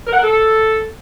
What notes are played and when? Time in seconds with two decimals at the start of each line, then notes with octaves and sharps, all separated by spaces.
0.07 A#4
0.12 F#5
0.18 A#4
0.23 A4